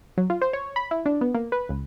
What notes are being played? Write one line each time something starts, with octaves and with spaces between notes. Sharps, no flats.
F#3
F4
C5
C#5
B5
E4
D4
B3
A#3
B4
C#2